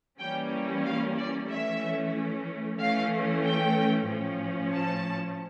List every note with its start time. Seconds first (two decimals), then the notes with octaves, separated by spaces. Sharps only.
0.20 E3 G3 A#3 C#4 G5
0.85 F5
1.17 D5
1.49 E3 A3 C#4 E5
2.79 E3 A3 C#4 F5
3.44 G5
4.08 A2 F3 C#4
4.73 A5